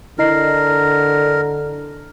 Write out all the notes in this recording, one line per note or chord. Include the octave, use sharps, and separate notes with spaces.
D3 E4 A#4 D#5 C7